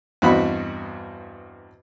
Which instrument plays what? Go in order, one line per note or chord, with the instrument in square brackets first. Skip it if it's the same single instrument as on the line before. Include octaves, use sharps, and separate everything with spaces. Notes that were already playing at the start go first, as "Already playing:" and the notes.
[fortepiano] E2 G2 C4 F#4 D#5 B5